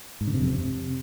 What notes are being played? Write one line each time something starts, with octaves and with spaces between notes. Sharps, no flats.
G#2
D3
C3
F2
C3